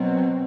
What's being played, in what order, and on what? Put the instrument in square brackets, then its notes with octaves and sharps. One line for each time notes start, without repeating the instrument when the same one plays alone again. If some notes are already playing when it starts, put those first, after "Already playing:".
Already playing: [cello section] B2 F#3 C4